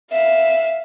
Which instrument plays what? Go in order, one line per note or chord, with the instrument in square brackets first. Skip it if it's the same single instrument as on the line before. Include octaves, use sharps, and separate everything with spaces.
[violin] E5 F5